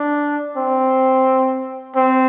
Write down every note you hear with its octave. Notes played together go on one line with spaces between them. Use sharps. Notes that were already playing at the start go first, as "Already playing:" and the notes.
Already playing: D4
C4
C4